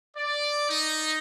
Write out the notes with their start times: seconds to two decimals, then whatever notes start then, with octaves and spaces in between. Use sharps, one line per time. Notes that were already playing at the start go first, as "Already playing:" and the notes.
0.17 D5
0.70 D#4